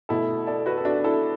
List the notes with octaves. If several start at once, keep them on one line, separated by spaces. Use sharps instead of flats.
B2 A3 E4 A4
A4 D5
F#4 B4
A4
D4 F#4
E4 A4